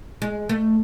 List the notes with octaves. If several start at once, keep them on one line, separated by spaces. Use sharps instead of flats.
G#3
A3